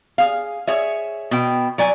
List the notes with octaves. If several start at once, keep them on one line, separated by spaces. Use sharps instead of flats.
G#4 F5
G#4 C#5 E5
B2 G5
F#3 D5 G#5